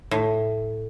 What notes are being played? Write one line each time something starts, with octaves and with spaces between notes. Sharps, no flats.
A2